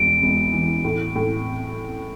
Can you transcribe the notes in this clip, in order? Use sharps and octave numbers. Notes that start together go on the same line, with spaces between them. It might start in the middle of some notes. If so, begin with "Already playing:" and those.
Already playing: E1 E3 D7
E1
E3
A2
A2